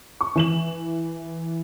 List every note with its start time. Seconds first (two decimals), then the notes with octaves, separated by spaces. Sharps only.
0.21 C#6
0.35 E3 E7 F#7